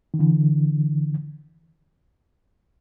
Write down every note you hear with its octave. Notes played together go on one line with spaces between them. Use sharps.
D#3
D3 E3